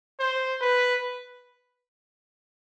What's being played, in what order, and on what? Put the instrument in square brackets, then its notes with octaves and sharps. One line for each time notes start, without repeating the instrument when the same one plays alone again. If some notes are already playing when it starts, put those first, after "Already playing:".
[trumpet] C5
B4